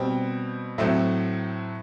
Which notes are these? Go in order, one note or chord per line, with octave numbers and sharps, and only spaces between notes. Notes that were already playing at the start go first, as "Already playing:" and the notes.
Already playing: B2 G3 C4 G5
A2 F#3 A3 C4